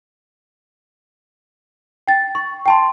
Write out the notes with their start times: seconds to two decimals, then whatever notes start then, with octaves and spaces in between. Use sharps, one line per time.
2.08 G5 A6
2.35 C#6
2.66 G5 A5 C6